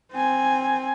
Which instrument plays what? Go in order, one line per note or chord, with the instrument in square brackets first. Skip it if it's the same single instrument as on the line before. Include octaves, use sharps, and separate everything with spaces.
[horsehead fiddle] C4 G#5